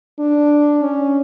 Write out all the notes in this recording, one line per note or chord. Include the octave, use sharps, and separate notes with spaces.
D4
C#4